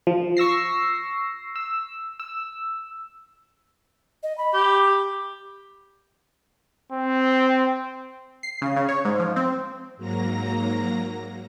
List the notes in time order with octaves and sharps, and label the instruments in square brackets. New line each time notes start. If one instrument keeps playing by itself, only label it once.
[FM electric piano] F3
C#6 E6 A#6 C7
E6
E6
[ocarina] D#5
B5
[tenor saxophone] G4
[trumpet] C4
[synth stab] C7
C#3
C#3
C#5
G#2
F3
C4
[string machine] G#2 F#3 A#3 A#5 A#6